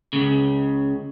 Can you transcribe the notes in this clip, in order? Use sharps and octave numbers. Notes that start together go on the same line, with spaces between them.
C#2 C#3